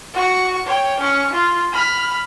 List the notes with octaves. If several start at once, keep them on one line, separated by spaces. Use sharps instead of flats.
F#4 C#6
C#5 G5
C#4 C#6
F4
B5 F6